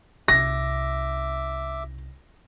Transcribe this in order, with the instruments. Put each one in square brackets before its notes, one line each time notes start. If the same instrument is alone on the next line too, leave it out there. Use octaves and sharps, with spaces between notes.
[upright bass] C2 C#4 [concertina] E5 D6 [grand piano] A#6